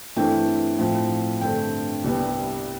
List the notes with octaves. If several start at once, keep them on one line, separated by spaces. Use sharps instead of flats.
G2 E3 A3 C4 G5
A2 F3 C4
G2 D3 A3 C4 G5
C2 C3 G3 B3